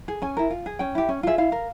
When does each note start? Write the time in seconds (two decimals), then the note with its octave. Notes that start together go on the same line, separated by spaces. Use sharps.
0.08 G#4
0.22 C#4 G#5
0.37 E4 A#4
0.51 F4
0.66 G#4
0.79 C#4 G5
0.95 E4 G4
1.09 C#4
1.23 F4 G#4 E5
1.38 E4 F5
1.52 A#4